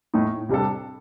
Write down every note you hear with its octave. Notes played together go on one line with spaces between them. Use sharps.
A2 A3 D#4
C3 G3 D4 A4